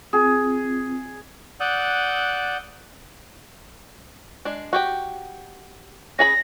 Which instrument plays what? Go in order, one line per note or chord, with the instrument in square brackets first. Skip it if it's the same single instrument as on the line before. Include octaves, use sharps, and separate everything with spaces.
[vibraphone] C4 F4 [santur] G#4
[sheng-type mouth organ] D5 F#5 D#6 E6 F#6 G6
[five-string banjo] G#3 D4
F#4 G4 G5
[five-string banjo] C#4 G#4 B5 [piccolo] A#6